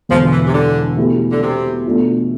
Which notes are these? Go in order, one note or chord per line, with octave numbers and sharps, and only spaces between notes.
E1 E2 D3 F3
E3
C3
D3
B2 A3 E4 G4
D3
C3
B2 A3 D4 F4